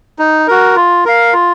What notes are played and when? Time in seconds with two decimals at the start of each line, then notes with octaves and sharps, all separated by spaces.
0.19 D#4
0.48 F#4 A#4
0.76 F4
1.05 A#4 F5
1.33 F4